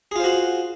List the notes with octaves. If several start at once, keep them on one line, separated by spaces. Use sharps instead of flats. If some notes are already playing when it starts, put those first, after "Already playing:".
F4 F#4 G#4 C5